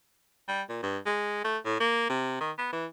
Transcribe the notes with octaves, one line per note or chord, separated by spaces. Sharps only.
G3
A#2
G2
G#3
A3
A2
A#3
C3
D#3
B3
E3